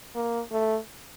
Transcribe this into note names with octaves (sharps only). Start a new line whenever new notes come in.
A#3
A3